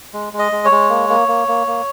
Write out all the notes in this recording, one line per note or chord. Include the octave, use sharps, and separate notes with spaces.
G#3
G#3
D#5
G#3
C#5
G#3
A#3
A#3
A#3
A#3
A#3